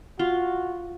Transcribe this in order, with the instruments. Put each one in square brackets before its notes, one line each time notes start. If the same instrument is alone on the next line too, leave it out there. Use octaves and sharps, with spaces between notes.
[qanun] F4 [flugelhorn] F#4